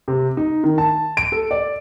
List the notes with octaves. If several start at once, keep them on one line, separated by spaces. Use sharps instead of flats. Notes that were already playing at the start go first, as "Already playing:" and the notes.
C3
D#4
D#3
A5
D7
A4
D5